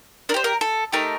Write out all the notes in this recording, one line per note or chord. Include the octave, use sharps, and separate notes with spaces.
D4 A#4
G4 C5
A#4
A4
A3 D#4 G4 A#4